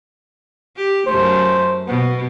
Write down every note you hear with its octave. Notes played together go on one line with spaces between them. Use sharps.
G4
F#2 A3 C5
B2 B3